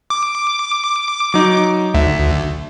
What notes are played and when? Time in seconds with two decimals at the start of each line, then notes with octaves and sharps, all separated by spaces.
0.10 D6
1.34 F#3 D#4
1.94 D2 E5